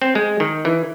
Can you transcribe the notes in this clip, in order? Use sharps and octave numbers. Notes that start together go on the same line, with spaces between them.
C4
G#3
D#3
E3